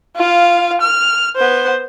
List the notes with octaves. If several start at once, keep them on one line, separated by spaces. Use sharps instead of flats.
F4 F5
F6
B3 C5